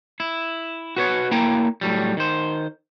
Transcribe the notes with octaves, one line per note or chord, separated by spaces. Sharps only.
E4
F#4 B4 C#5
A#3 E4 G5 A#5
A2 F#3 G3
D#3 C5